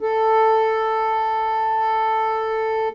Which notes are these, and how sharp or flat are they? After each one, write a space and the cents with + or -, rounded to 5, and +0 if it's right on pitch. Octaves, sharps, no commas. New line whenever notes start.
A4 +5